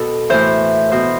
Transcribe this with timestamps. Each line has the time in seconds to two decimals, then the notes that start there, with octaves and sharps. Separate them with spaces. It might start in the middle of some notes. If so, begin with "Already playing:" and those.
Already playing: B2 A4
0.29 A2 E3 C5
0.92 B2 C5